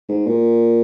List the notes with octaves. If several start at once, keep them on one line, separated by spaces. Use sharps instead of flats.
G#2
A#2